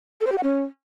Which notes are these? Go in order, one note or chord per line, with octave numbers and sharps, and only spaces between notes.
A4
C5
G4
F#5
C#4